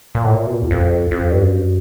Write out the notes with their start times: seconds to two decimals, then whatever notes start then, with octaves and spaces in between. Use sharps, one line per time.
0.15 A#2
0.24 A2
0.34 A#2
0.47 B2
0.55 A#2
0.62 E2
0.71 F2
1.11 F2
1.32 G2
1.43 F#2